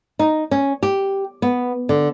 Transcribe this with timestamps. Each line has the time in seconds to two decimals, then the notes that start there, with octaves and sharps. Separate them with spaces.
0.19 D#4
0.51 C#4
0.83 G4
1.42 B3
1.89 D3